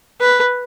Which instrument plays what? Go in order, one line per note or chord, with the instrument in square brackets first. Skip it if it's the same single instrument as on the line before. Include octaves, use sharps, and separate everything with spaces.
[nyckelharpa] B4